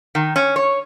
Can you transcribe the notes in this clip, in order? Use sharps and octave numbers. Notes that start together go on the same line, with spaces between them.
D#3
C#4
C#5